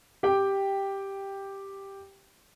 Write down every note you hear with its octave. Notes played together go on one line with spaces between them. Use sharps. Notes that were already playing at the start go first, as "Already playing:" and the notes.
G4 G5